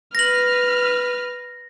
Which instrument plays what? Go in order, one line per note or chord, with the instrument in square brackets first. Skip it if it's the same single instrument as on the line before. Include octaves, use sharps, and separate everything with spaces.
[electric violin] B4 F6 [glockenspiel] A#6 F#7